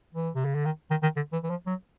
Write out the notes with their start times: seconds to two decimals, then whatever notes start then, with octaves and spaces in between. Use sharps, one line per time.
0.14 E3
0.35 C3
0.45 C#3
0.55 D3
0.65 D#3
0.90 D#3
1.02 D#3
1.16 D3
1.32 E3
1.43 E3
1.50 F3
1.66 F#3